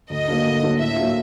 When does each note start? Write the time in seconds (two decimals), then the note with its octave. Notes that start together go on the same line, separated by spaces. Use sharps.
0.10 D2 D#5
0.28 D3 F#3 A#3 D4
0.45 D2
0.62 D3 F#3 A#3 D4
0.79 A2 E5
0.96 F#3 A#3 D4 F4